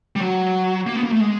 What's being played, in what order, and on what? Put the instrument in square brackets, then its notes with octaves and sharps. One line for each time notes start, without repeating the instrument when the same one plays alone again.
[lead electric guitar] G3
F#3
A#3
B3
A#3
A3
G#3